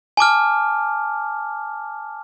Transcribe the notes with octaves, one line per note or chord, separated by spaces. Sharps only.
G#5 A5 D6 F6